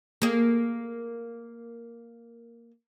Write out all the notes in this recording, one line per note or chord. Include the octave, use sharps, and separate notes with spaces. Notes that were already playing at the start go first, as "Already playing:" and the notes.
A#3 G#4